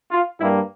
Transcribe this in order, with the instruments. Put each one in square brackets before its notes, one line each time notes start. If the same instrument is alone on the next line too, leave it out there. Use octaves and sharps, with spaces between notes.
[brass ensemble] F4
G2 G3 A#3 E4